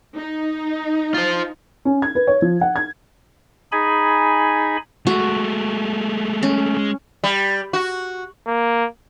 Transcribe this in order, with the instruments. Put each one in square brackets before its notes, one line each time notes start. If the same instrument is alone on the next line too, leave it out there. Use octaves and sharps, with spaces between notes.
[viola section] D#4
[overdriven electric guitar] F4 C5
[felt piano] C#4
G#6
B4
C#5
F3
F#5
G#6
[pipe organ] D#4 G#4 G#5 B5
[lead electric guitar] G#3 A3 [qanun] F#4
[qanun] C#4
[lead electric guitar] G#3
[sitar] G3
F#4
[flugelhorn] A#3